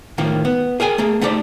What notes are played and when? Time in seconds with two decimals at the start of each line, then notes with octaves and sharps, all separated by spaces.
0.18 A2 D#3 F3 A#3
0.45 B3
0.80 G#4 A#4 G5 G#5
0.98 A3 A#3 G#4
1.21 A3 B3 D#4 G4 C5 D5